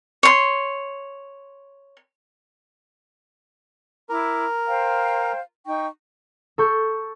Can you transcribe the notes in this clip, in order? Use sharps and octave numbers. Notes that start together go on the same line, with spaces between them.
C#5 C6
E4 A#4 B5 D6
C5 F5 G5
D#4 G5 C#6
A4 C#6 G6